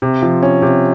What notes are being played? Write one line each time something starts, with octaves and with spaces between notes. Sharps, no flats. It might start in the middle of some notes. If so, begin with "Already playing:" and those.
C3
F3
C#4
C3